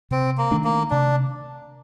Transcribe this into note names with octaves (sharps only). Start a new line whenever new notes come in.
C3 C4
A#3
D#3 A3 D4
A#3
C3 D4